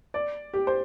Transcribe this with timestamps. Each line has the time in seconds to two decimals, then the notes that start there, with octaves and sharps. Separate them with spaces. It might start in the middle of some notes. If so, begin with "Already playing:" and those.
0.14 D5
0.54 G4
0.67 C5